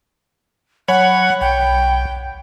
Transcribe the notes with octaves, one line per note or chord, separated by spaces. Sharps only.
F#3 C#5 F#5 G#5 B5
B1 G5